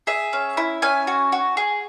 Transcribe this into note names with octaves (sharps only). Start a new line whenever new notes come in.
G#4 E5
C#4
E4
C#4 G#5
F#4
F#4
G#4